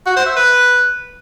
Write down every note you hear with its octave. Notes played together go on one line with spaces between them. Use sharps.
F#4
C5
E5
B4